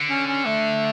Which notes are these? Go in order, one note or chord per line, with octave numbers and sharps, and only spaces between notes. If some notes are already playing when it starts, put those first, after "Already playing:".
Already playing: D3
C#4
C#4
A3